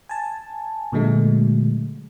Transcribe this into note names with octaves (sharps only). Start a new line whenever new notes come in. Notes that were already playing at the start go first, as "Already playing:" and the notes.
G#5 A5
A#2 D3 F#3 G#3 A3